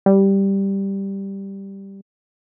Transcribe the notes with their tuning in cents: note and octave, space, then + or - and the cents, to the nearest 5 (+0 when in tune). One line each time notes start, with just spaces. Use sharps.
G3 +0